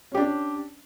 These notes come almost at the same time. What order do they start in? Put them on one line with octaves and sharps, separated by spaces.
C#4 G4 D4